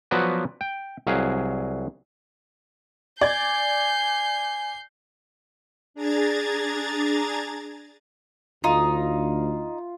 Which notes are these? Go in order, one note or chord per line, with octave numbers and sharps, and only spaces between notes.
F3 F#3 B3 F#4 B4 D5
G5
C2 F#3 G#4 F5
D5 G#5 G6 G#6 C7
D4 G#4 A#5 G#6 A6
D2 D#4 F4 F5